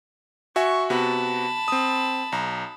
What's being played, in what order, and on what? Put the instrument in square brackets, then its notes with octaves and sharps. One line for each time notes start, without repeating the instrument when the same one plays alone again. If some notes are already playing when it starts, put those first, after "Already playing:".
[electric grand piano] F#4 E5 G#5 [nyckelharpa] C#6
[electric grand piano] C3 B3 F#4 [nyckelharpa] A5 B5
[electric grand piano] C4 D#6
B1 A#5